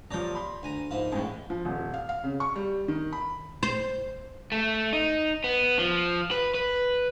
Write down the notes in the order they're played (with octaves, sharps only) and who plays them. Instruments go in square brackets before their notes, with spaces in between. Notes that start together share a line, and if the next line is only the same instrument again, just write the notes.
[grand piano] D#1 F3 [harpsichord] C#5 D5 A#5
[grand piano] B5 C6
[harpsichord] D2 G#5 A#5
[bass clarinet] G#2 [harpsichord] F3 A#3 E4
[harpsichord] A1 G#3 [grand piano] F2 A2
[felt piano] F3
D#1
F5
F5
C#3
C#6
G3
D#3
B5
[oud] C5
[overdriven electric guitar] A3
D#4
B3
F3
B4
B4